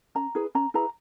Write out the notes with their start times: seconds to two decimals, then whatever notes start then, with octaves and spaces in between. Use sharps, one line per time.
0.15 C#4 A#5
0.35 E4 G#4 B4
0.55 C#4 A#5
0.74 E4 G#4 B4 A#5